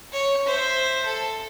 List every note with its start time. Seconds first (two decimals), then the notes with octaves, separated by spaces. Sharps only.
0.13 C#5
0.46 C5 E5
1.06 A4